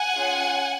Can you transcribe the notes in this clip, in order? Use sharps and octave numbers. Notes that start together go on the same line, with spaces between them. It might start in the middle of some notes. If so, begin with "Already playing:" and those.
Already playing: F#5 G#5
C#4 F4 G#4